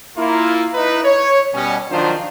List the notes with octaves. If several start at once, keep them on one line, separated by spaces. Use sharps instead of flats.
A#3 E4 F4
D#4 E4 B4
C#5
B2 G3 C#4
D#3 F3 F#3 D4 F4 C5